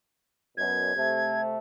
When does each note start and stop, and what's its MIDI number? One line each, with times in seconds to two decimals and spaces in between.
0.57 0.95 42
0.57 0.95 47
0.57 1.41 92
0.96 1.58 48
0.96 1.58 57